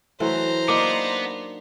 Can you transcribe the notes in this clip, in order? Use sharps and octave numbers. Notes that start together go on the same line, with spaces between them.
E3 F#3 A3 C5 A#5
A#3 B3 D4 D#4 D6